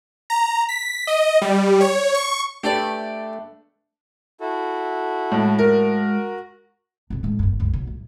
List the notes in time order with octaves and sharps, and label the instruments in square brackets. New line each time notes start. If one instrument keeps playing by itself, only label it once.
[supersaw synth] A#5
B6
D#5
G3
C#5
C#6
[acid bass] A3 [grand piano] D4 A4 B4 [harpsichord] G4 D5
[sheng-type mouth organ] E4 F#4 A4
[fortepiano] A2 [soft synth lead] G#3
[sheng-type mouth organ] F#4 [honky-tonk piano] A#4
[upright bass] F2 B2
A2 G#3
G1 F#2
C#2 F#2
B1
A2